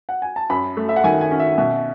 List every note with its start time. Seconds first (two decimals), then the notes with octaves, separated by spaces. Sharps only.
0.09 F#5
0.22 G#5
0.36 A5
0.50 F#2 B5
0.77 A3
0.89 E5
0.96 F#5
1.04 D#3 G#5
1.21 G#5
1.31 C#4
1.40 E5
1.58 B2 E5